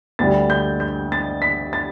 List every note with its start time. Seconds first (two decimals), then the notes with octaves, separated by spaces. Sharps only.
0.19 D2 D3 G3 A6
0.50 G6
0.80 G6
1.12 A6
1.42 B6
1.73 A6